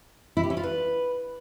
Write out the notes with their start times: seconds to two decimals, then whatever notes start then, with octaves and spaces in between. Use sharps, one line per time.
0.37 E4
0.43 G4
0.50 C#4
0.57 F4
0.63 B4